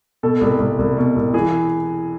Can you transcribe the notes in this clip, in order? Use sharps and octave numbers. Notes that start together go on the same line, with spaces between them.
B2 A4
C2
C2
C2
B2
C2
E3 G#4